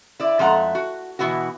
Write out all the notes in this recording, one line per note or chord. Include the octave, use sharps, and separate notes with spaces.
E4 D5
F2 G#3 A3 F#5 A#5
F#4
B2 E3 B3 E4 F#4